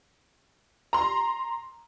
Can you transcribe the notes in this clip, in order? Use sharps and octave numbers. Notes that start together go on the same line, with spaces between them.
A#5 C6